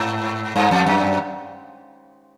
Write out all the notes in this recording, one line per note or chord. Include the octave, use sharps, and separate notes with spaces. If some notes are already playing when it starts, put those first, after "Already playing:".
Already playing: G#2
G2
F2
F#2